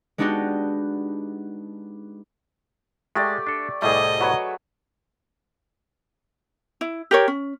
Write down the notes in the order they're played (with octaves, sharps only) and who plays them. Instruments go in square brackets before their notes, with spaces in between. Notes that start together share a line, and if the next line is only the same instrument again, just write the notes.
[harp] G#3 B3 D4 D#4 F#4 G4
[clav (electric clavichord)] G#3 [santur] A3 G4 D5
[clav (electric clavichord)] D4 A4
[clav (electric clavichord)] C2 A2 G3 [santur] A3 G#4 [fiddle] D#5
[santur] F#3 B4 C#5
[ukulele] E4
G4 A#4 C#5
C#4